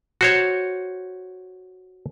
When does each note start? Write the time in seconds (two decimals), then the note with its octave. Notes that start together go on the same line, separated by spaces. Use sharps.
0.21 F#4 C5 C#5